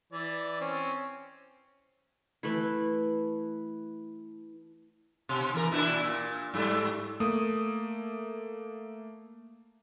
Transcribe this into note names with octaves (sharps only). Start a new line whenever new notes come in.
E3 D5
C4 C#4
E3 A3 E4
B2
E3 A#4
A#2 D4 E4
A#2
G#2 G3 A3
A3 A#3 D#6